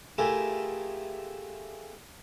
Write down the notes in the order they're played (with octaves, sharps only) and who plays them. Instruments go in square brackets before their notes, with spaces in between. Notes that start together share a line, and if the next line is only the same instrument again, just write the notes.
[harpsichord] A3 E4 F4 G4 G#4 A#4